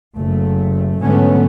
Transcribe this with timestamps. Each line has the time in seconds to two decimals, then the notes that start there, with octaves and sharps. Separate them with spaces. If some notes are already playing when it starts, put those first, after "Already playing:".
0.15 F#1 A3
1.02 G#2 D3 F#3 A3 B3 C#4